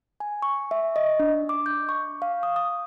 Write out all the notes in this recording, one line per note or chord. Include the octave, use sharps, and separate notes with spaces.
G#5
C#6
E5
D#5
D4
D6
G6
C#6
F5
D#6
D#6